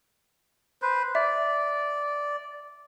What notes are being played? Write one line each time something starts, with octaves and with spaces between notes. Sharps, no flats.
B4 C5
D5 E5